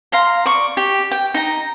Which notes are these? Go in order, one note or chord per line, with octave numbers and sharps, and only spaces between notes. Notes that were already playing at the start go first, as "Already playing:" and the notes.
F5 A#5 C6
D5 C#6
G4
G5
D#4 A#5